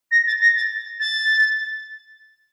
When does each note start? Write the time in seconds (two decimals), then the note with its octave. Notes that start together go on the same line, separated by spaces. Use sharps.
0.11 A#6
0.27 A6
0.41 A#6
0.56 A6
1.00 A6